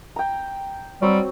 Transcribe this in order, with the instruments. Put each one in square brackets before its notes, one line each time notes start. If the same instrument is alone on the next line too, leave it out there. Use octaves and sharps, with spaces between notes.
[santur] G5 A#5
[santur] F#3 C4 [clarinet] G3